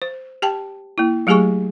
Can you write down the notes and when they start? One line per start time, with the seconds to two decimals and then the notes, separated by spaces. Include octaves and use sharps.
0.02 C5
0.42 G4 G5 A5
0.98 A#3 E4
1.27 F#3 A3 G4 G#4 G#5 C#6